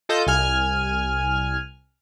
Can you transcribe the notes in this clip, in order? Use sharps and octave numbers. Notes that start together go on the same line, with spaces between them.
F4 A4 D#5 G6
C2 G#5 F6